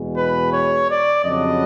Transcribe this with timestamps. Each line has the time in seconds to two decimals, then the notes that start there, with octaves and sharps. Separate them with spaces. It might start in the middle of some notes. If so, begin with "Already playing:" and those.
Already playing: E2 B2 G#3
0.16 B4
0.52 C#5
0.89 D5
1.24 F2 C#3 F#3 B3 D4 D#5